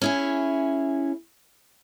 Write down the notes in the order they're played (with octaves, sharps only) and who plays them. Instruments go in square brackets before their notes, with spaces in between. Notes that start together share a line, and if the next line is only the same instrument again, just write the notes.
[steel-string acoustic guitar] C#4 E4 G#4